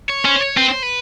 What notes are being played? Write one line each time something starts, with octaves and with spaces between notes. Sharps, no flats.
C#5
C#4 C5
C#5
C4 B4
C5
B4